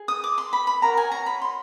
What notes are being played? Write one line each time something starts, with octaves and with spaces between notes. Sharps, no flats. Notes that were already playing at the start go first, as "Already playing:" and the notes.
Already playing: G#4
D#6
D6
C6
B5
B5
F#4 A#4 C#5 A#5
G#5
A#5
B5
C6